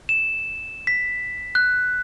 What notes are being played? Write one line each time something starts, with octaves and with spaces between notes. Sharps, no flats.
E7
B6
F#6